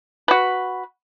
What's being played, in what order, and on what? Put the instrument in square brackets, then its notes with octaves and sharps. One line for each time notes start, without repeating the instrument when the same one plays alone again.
[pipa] F#4 B4